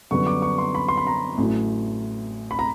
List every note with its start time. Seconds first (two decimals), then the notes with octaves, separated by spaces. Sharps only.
0.11 F#2 D3 G3 B3 C#6
0.27 D6
0.42 C#6
0.58 C6
0.75 B5
0.88 C6
0.97 B5
1.07 A#5
1.38 A1 A2 F#3
2.51 B5
2.59 A#5